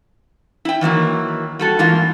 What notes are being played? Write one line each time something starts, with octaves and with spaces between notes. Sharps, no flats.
E4 G5
D#3 E3 F#3 A#3
G3 F#4 A4
G#2 E3 A#3 F4